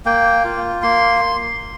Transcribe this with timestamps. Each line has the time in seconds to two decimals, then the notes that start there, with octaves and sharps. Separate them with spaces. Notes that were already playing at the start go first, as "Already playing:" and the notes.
0.05 A#3 G5
0.45 F4
0.82 A#3 C6